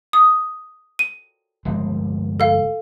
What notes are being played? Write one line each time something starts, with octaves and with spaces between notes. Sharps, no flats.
D#6
D#7
G1 F3 G#3
A4 F5